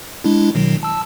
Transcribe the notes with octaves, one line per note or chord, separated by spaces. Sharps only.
G#3 D4 E4
B2 D#3 F#3
A5 E6